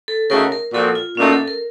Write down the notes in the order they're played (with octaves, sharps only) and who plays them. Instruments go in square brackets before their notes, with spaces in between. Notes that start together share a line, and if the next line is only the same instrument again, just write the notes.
[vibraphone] A4
[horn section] C#3 A3 D#4 F#4 [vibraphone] A#4
[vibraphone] A#4
[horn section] A#2 F3 C4 F#4 [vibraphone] A4
[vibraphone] F4
[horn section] A#2 A3 D#4 F#4 [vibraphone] C#4
[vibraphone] A4
A#4